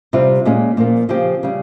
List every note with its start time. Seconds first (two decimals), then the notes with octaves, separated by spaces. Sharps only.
0.13 C3 G3 C4 F4
0.45 A#2 G#3 C#4
0.77 A#2 F3 A#3
1.09 C#3 F3 C4 G4
1.43 C#3 G3